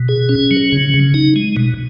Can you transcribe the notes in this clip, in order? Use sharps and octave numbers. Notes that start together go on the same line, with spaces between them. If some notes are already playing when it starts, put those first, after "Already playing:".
Already playing: B2
G#4
C#4
F#3
C#3
C#3
D#4
G#3
B2